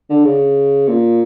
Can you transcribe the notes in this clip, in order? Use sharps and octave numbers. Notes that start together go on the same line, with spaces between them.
D3
C#3
A#2